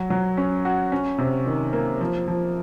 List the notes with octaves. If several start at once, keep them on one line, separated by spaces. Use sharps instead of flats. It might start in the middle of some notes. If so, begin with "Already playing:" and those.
Already playing: F#3
F#3
C#4
F#4
C#4
C3
D#3
A#3
F3
F3